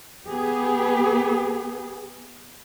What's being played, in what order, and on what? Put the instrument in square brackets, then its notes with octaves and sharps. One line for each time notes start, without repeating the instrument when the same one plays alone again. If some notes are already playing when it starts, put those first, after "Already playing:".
[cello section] B3 G4 G#4